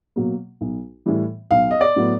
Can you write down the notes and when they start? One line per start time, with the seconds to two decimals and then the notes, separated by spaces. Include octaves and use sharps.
0.16 B2 F#3 A#3
0.61 B1
1.06 A2 E3 G3
1.51 B1 F5
1.71 D#5
1.81 D5
1.96 A2 F#3 B3